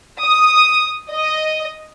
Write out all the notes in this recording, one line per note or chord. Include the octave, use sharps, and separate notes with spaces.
D#6
D#5